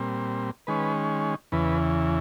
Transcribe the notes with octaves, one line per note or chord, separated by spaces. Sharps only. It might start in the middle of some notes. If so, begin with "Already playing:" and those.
Already playing: A#2 G3 C4
D#3 G#3 C#4 B4
E2 C#3 E3 B4